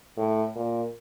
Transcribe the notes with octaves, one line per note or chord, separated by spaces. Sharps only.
A2
A#2